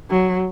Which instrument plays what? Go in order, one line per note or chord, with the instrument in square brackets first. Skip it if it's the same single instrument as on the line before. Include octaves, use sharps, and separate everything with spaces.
[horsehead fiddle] F#3